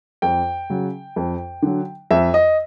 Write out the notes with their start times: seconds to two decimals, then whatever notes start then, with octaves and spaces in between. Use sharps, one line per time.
0.22 F2 G5
0.70 C#3 F#3
1.16 F2
1.62 D3 F#3
2.11 F2 E5
2.34 D#5